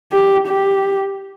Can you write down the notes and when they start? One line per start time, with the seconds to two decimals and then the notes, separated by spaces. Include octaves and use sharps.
0.12 G4
0.47 G4